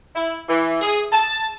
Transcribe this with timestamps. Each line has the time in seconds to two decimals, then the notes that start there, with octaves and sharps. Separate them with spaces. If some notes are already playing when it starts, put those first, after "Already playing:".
0.15 E4
0.49 E3
0.81 G#4
1.12 A5